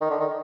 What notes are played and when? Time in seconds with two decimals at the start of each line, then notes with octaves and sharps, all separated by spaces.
0.01 D#3
0.10 D3
0.20 D#3